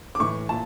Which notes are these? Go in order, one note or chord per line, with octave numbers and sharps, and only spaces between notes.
D6
A2 E3 C#6
A#2 A5